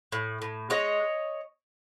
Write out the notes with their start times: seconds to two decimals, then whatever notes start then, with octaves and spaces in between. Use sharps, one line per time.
0.12 A2
0.42 A2
0.70 G#3 C#5 D#5